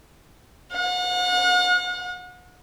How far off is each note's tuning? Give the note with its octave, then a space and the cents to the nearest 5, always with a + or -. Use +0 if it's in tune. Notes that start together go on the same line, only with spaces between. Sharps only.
F#5 -40